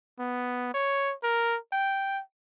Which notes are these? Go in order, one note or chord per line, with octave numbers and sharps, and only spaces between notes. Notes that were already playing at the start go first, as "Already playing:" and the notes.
B3
C#5
A#4
G5